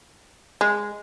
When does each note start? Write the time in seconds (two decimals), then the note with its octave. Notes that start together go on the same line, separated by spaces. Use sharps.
0.61 G#3